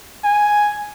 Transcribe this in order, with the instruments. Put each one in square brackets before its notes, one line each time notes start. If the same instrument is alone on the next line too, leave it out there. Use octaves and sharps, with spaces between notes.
[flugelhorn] G#5